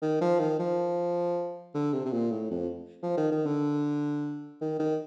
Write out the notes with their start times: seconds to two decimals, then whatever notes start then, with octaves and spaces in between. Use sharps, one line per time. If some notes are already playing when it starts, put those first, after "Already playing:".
0.02 D#3
0.21 F3
0.40 D#3
0.59 F3
1.74 D3
1.93 C3
2.05 C3
2.13 A#2
2.31 A2
2.51 F2
3.03 F3
3.17 D#3
3.32 D#3
3.46 D3
4.61 D#3
4.79 D#3